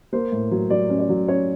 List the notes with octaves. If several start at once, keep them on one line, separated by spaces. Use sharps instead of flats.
A#3 C5
A2
F#3
F#3 D5
C#4
D5
F#3
C#4 C#5